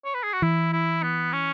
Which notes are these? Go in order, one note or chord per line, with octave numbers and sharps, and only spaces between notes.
C#5
B4
G#4
F#4
E3 E4
E4
B3
C#4